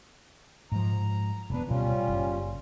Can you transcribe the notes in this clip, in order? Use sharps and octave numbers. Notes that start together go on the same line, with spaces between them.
G#2 F3 A#5
E1 B3 D4 B4
D1 B2 G3 C#4 F4
F#1